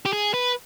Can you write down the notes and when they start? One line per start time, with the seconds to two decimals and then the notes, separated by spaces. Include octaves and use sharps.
0.05 G4
0.13 G#4
0.34 B4